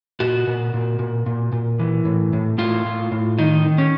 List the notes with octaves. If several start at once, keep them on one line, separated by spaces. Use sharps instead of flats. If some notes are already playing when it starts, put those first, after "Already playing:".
A#2 F#4
A#2
A#2
A#2
A#2
A#2
E3
A2
A2
A2 F4
A2
A2
D#3 D#4
D#3
C#4